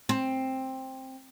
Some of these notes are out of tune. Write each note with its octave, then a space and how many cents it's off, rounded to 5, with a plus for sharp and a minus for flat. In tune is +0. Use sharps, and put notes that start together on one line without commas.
C4 +10